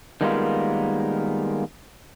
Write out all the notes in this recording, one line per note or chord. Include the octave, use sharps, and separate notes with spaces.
D#3 G3 G#3 A#3 B3 F4